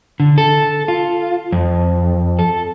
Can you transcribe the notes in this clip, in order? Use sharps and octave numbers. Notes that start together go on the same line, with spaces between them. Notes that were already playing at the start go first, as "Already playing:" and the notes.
D3
A4
F4
F2
A4